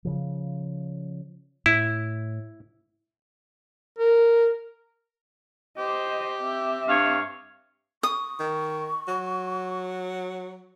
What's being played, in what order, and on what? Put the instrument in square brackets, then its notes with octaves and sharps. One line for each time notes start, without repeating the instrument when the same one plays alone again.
[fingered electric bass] C#3 F3
[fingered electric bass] A2 [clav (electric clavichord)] E4
[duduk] A#4
[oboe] G4 [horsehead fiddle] C5 D#5
[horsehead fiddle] C4 E5
[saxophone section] G2 C#5 F5
[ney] C#6 [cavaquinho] D#6
[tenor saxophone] D#3
F#3